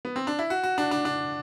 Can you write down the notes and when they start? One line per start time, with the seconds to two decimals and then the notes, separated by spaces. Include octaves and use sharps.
0.05 B3
0.16 C4
0.27 D4
0.39 E4
0.50 F#4
0.63 F#4
0.78 D4
0.91 D4
1.05 D4